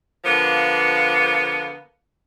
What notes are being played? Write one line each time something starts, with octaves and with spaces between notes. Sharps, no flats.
D3 F3 A#3 B3